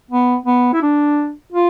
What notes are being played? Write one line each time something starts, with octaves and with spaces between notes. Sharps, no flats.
B3
B3
E4
D4
F4